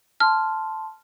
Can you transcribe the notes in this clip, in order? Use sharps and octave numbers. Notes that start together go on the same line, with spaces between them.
A5 C6 F6